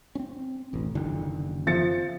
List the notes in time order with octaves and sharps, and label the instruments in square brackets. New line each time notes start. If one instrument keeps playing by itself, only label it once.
[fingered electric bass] C4 C#4
E1 A1
F#1 D3 D#3
[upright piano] F3 A6 C#7